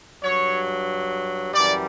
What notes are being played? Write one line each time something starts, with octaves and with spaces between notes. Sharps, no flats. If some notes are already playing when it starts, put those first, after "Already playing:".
G2 F#3 C#5
F#2 E3 G3 D5